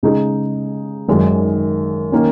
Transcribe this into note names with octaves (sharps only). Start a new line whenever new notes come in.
C#3 G#3 D#4 G#4
G#1 F#2 D#3 G#3
D#3 A#3 C#4